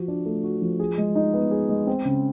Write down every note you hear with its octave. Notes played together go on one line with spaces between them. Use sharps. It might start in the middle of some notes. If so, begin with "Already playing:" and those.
Already playing: F3 F#4
D4
A3
F#4
F3
G#4
G#3
D#4
B3
G#4
G#3
C4
C#3